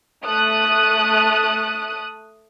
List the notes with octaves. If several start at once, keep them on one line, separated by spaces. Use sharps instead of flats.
A3 D#6 F#6